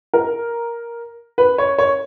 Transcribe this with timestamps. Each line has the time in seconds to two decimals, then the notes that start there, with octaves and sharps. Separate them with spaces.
0.14 A#4
1.38 B4
1.58 C#5
1.78 C#5